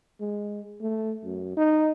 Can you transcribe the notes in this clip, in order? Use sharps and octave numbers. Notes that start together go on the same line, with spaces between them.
G#3
A3
F#2
D#4